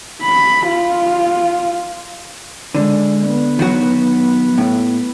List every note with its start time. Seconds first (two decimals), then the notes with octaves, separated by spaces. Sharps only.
0.22 B5
0.68 F4
2.75 D3 G#3
3.28 B3
3.59 D#3 F#3 F#4
4.58 A2